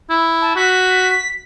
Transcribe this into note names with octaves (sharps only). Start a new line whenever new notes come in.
E4
A5
F#4 B6